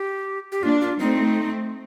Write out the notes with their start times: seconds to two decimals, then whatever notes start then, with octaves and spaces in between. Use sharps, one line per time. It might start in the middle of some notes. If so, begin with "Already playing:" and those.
Already playing: G4
0.52 G4
0.63 A#3 D4 F4
0.81 F4
0.99 A3 C4 D#4